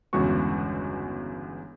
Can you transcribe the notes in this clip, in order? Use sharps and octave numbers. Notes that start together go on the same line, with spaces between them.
G1 E2 C#3 G#3 F#4 C#6